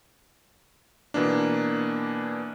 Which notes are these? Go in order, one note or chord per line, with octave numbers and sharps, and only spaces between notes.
B2 E3 A#3 D4